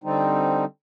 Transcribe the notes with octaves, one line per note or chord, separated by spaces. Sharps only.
D3 G3 C4 D#4